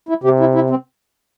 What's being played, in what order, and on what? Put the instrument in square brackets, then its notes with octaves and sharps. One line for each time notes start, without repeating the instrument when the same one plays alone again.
[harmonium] E4
[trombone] C3 [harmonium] G4
[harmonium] E4
E4
C4